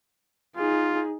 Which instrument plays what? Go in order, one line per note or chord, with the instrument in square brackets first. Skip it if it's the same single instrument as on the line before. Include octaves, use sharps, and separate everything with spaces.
[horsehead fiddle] D#4 G#4 [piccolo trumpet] F4